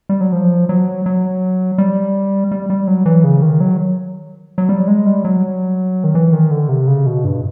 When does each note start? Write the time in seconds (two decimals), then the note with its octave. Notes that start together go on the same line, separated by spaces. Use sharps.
0.09 G3
0.21 F#3
0.32 F3
0.69 F#3
1.06 F#3
1.78 G3
2.51 G3
2.70 G3
2.87 F#3
3.06 E3
3.24 C#3
3.42 D#3
3.60 F#3
4.58 F#3
4.69 G3
4.88 G#3
5.06 G3
5.25 F#3
6.04 D#3
6.15 E3
6.33 D#3
6.51 D3
6.69 C3
6.87 C#3
7.06 B2
7.24 G2